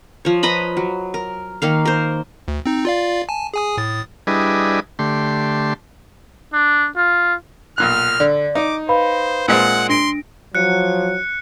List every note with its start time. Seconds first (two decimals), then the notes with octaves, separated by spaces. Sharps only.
0.25 F3 C#5
0.43 B4 D#5 A#5 B5
0.77 F#3
1.14 A#4
1.62 D#3 A#3 F5
1.85 A#4 C5
2.48 D2
2.66 C4 D#4
2.85 F4 D5 F5
3.29 G#5 A5
3.54 G#4 G#5 D#6
3.77 A2 D#6 A6
4.27 G3 D4 E4 G#4 B4 D#5
4.99 D3 A3 G4 C6
6.53 D4
6.97 F4
7.78 B1 A#2 F6 F#6
8.20 D3 D5
8.55 D#4 D6
8.89 B4 C5 F5 B5
9.48 A#2 G#3 C4 F#5
9.89 D4 C6 A#6 D7
10.55 F3 F#3 F#6 C#7